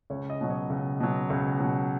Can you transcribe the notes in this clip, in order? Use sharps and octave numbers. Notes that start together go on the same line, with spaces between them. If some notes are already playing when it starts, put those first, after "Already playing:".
C#2 C#5
D#5
B2 F#3
C#5
C#2
B2 F#3
C#2
B2 F#3